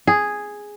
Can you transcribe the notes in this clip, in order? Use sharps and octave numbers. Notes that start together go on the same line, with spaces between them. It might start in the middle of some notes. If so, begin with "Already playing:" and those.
G#4